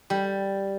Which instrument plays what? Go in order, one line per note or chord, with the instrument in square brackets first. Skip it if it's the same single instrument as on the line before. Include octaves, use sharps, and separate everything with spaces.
[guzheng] G3